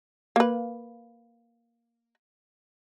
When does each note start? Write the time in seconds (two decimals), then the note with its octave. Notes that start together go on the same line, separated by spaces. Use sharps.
0.36 A#3 B4